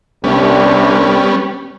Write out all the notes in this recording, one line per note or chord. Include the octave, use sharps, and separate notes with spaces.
C2 G3 B3 C#4 D4